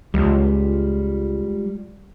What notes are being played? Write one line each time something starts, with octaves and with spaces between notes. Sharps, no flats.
C#2 G3 G#3 F4